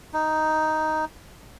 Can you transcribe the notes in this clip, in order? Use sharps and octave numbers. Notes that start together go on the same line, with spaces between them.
D#4